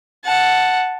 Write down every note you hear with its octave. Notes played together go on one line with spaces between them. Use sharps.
F#5 A5